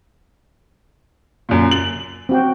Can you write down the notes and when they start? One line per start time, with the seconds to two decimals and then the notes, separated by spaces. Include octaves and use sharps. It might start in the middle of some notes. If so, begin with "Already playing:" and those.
1.49 F#2 A#2
1.71 F#7
2.29 C4 F#4 G5